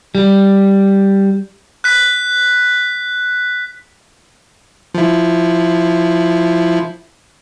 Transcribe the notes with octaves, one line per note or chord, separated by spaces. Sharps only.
G3
F#6 B6
F3 E4